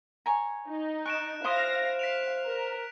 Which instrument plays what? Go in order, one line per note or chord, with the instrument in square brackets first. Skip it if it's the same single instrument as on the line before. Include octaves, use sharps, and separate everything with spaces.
[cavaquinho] C#5 G#5 A#5
[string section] D#4
[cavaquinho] A5 C#6 [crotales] F#6 D7 E7
[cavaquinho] E4 C6 D#6 [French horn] C5 [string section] F5 A#6
[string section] F5 [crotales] B6 D7 F7
[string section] A#4